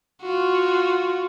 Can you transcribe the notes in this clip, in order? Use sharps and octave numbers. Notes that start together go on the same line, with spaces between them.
F4 F#4